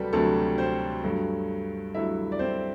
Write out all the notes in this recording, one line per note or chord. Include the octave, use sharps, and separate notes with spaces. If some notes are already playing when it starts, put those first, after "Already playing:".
Already playing: D2 C3 F#3 G3 F#4 G4 A4 B4
D2 C3 F#3 A3 A4
C4 C5
G2 F#3 A3
G2 F#3 A3 E4 E5
D5
C4 C5